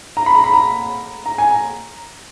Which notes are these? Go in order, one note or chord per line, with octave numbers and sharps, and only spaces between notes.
A#5
B5
A#5
B5
A#5
A#5
G#5
A#5